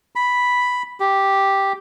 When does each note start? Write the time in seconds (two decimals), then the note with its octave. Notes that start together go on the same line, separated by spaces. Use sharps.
0.16 B5
1.00 G4